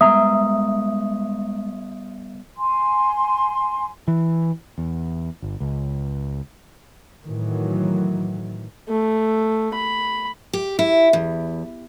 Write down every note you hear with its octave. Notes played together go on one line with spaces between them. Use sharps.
G3 G#3 A#3 B3 E5 A#5 D#6
G#5 C6
E3
E2
G1
C#2
A2 D#3 E3 F#3
A3
B5
G4
E4
E2